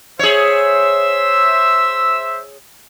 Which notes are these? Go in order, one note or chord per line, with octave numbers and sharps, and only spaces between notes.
G#4 C5 C#5 E5 E6